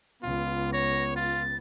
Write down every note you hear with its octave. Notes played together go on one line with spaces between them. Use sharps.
C#2 B3 F4
C#5 A#6
F4 A6